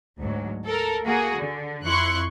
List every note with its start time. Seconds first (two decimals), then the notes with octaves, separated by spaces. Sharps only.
0.19 D2 G#2 F#3
0.66 A4 A#4
1.05 A#3 F#4 G#4
1.37 D3
1.86 F2 E4 C6 C#6 F#6